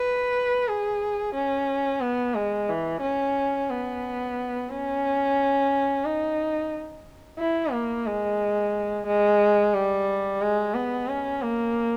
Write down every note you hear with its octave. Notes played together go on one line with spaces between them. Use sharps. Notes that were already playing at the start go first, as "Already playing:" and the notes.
Already playing: B4
G#4
C#4
B3
G#3
E3
C#4
B3
C#4
D#4
E4
A#3
G#3
G#3
G3
G#3
B3
C#4
A#3